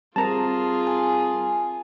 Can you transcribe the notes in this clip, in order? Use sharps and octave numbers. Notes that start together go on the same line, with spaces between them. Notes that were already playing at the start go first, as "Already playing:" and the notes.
G3 C4 F4 G#4 A#4 A5 A#5
G#5